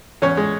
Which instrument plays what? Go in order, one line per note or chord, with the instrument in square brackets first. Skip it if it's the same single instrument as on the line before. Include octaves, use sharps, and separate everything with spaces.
[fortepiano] E2 C#4 C#5
G#3